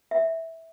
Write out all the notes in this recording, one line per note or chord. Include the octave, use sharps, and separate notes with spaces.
E5